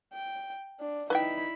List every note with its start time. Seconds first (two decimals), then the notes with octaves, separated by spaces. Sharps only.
0.13 G5
0.80 D4
1.10 D#4 E4 B4 E5 G5 B5